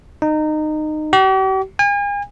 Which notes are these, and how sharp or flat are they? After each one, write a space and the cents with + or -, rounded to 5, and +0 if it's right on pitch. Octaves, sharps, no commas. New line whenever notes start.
D#4 -20
G4 -45
G#5 -40